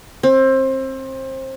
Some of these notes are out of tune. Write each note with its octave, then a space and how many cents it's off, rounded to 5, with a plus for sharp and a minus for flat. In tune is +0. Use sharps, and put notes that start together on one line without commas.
C4 +25